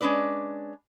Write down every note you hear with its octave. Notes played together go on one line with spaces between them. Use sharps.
G#3 C#4 D4 B4 D5